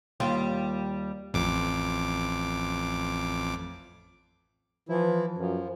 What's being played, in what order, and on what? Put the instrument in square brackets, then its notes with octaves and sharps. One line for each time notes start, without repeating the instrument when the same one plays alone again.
[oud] D#2 G3 F4
[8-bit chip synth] A1 F2 D6
[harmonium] E3 E4 [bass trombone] F3
[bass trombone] F#2 [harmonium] F3